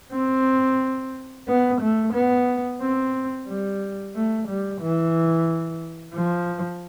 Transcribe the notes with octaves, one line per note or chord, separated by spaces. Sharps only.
C4
B3
A3
B3
C4
G3
A3
G3
E3
F3